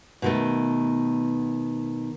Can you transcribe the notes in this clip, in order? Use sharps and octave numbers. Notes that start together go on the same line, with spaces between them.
B2 D#3 A3